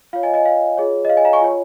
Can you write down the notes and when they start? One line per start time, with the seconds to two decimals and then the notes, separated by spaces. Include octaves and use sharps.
0.13 F4 F5
0.16 C#5
0.23 D#5 G#5
0.34 D#5 G#5
0.46 F5
0.77 F4 G#4 C#5
1.05 D#5
1.09 F5
1.17 D#5 G#5
1.25 F5 A#5
1.33 G#5 C#6
1.41 F4 C#5